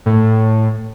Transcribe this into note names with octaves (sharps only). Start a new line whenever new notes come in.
A2